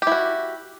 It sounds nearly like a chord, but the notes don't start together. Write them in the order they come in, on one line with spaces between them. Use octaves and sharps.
G4 E4 F#4